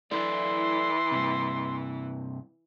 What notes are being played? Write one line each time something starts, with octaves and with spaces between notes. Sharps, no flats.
E3 E4 A4 D5 C6
G2 C3